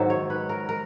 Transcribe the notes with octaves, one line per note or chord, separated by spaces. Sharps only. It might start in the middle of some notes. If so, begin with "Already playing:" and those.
Already playing: G#2 D#3 F#3 E5
C#5
B4
A#4
A#4